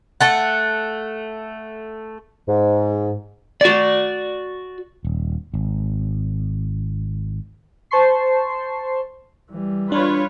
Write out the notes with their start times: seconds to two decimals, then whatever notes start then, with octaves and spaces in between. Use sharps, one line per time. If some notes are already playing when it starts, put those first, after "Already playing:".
0.21 A3 A4 F#5
2.48 G#2
3.61 F#4 D5
5.05 D#1
5.54 G#1
7.91 C5 A5 C6 C#6 C7
9.52 E3 G3
9.92 D4 F4 B4 C#5